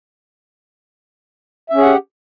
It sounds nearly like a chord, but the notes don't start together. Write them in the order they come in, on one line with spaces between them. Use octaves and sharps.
E5 C#4 G#4 F#5 G4